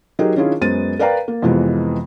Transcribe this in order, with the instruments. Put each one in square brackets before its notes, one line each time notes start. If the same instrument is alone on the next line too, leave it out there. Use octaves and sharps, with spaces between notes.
[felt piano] F#3 D#4 G4 G#4 A#4
D#3 C#4 D4 E4 F4 G#4
F#2 G#3 B3 C5 A6 D#7
A#4 B4 D5 F5 G5 A#5
A#3
F2 C3 E3 G#3 B3